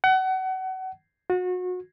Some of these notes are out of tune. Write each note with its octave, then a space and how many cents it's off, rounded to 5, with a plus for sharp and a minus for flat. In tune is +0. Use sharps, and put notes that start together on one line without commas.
F#5 +30
F#4 -30